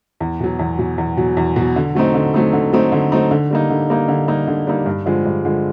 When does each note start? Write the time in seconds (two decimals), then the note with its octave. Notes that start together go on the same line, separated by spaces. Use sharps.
0.20 E2
0.40 B2 F#3
0.59 E2
0.79 B2 F#3
0.98 E2
1.17 B2 F#3
1.37 E2
1.56 B2 F#3
1.76 D3
1.95 F#3 A3 C4 D#4
2.15 D3
2.34 F#3 A3 C4 D#4
2.53 D3
2.73 F#3 A3 C4 D#4
2.92 D3
3.12 F#3 A3 C4 D#4
3.31 D3
3.51 G3 A#3 D#4
3.70 D3
3.90 G3 A#3 D#4
4.08 D3
4.28 G3 A#3 D#4
4.48 D3
4.67 G3 A#3 D#4
4.86 G2
5.06 D3 F3 G#3
5.25 G2
5.45 D3 F3 G#3